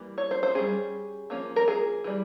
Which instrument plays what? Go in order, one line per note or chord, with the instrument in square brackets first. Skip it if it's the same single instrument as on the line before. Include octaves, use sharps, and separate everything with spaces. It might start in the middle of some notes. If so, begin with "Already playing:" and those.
Already playing: [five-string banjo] E3 G3 A#3
C#5
C5
C5
G3 C#4 G#4
F3 A#3 C#4
A#4
G#4
E3 G3